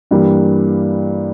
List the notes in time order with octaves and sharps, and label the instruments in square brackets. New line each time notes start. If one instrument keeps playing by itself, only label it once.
[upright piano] G2 E3 G3 A#3